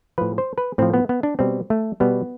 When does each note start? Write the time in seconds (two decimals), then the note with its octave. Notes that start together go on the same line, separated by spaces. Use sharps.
0.18 A2 F3 B4
0.38 C5
0.58 B4
0.78 A2 F3 C4
0.94 B3
1.09 B3
1.23 D4
1.39 B2 G3 C4
1.70 A3
2.00 B2 G3 B3